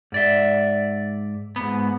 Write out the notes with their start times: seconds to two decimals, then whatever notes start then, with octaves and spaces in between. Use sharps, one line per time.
0.12 G#2 D5 E5
1.56 G#2 B3